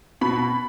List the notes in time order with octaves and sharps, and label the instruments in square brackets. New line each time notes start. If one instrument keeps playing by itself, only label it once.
[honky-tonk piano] B2 B5